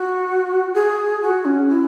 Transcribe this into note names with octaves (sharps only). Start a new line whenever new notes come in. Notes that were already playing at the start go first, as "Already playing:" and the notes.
Already playing: F#4
G#4
F#4
C#4
E4